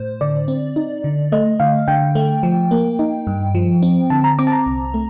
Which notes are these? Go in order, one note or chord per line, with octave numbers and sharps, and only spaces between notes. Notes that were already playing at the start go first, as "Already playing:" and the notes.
Already playing: A2 C5
D3 D5
C4
D#4
D3
A3 D#5
D3 F5
D3 G5
A3
F3
A#3
D#4
G2
F3
C4
D3 A5
A#5
C4 D6
A5
A#5
C2
A3